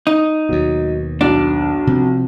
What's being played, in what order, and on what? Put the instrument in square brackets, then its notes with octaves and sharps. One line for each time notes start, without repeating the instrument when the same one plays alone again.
[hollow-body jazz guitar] D#4
[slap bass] D#2 B2 [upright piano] F#3
[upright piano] B1 [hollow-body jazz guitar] D4
[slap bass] C3 F3 C4